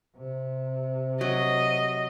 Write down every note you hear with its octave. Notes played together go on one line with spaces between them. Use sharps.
C3
F#3 D#5